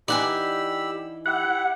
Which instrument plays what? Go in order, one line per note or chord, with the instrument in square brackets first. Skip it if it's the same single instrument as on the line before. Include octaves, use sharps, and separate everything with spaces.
[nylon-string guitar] E3 D#4 [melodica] G4 B5 E6 [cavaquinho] D5 F#5 G#5
[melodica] E4 G4 E5 [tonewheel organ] F#5